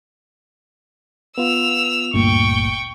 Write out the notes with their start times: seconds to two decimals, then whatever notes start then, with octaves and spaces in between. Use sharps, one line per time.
1.38 B3 F4 E6 F7
2.14 G1 D2 A#2 G5 C#6